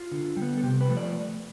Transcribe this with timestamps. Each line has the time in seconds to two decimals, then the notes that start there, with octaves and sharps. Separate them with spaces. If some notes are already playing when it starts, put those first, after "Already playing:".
Already playing: F4
0.12 D3
0.37 G3
0.42 B3
0.57 A4
0.63 C3 G4
0.81 B4
0.89 F3 A3
0.97 D5